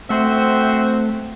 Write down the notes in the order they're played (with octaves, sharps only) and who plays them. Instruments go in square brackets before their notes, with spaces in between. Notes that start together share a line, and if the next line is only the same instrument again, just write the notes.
[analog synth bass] A3 [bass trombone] C4 [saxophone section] F#4 C5 E5